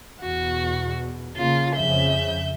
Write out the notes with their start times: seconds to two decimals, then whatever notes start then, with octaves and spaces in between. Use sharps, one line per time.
0.20 E2 B2 F#4
1.36 C#3 A#3 F4
1.75 F2 C#3 F3 E5 G6